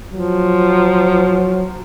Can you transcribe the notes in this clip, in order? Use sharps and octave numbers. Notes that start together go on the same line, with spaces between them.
F3 F#3